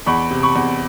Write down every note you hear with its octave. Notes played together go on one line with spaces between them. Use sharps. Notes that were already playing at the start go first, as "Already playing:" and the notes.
E2 B5 C#6
C3
B5 C#6
E2